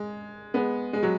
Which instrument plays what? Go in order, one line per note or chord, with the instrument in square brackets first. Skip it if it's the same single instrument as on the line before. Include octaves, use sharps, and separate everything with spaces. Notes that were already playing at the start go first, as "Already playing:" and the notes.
Already playing: [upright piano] G#3
G#3 B3
G#3
F#3